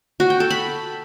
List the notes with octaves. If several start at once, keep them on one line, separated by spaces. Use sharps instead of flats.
F#4
G5
A4
B5